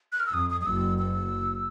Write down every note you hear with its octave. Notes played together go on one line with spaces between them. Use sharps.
F#6
F6
E6
F2 D#6
D#6
D#6
F#1 F#2 E6
E6